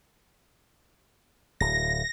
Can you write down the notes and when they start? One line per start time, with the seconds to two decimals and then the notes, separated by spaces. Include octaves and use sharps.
1.61 D1 A#6